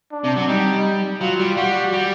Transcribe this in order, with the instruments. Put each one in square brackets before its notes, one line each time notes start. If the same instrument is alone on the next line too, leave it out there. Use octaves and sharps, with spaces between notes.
[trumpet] D4
[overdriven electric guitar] C3
F#3
[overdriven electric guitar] G3 [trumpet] D#4
[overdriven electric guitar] F#3 [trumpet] F4
[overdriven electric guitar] G3
[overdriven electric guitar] G3 [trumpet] F#4
[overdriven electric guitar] G3